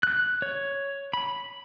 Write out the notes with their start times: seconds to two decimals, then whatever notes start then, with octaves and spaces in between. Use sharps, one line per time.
0.03 F#6
0.42 C#5
1.14 B5